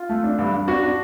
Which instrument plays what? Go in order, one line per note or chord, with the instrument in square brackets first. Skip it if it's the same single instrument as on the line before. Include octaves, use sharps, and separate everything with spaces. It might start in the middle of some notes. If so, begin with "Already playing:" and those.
Already playing: [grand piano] F4
A3
D4
G2
G2
D4 F#4
D4